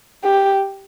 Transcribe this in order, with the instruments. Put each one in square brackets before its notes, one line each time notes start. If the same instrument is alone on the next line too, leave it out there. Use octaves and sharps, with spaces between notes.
[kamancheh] G4